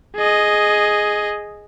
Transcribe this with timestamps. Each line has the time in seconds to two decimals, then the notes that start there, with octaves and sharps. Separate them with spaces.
0.16 G#4 D#5